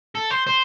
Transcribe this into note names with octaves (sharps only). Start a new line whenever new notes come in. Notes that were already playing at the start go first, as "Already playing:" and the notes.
A4
C5
C5